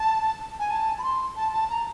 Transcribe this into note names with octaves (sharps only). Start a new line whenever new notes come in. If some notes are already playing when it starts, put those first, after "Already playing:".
Already playing: A5
G#5
A5
B5
C6
A5
A5
A#5